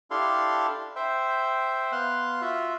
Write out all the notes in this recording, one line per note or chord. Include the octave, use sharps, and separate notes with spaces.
D4 E4 G4 A4 F5 C6
C5 E5 G5
B3 F5 C6 F#6
F4 F#4 E5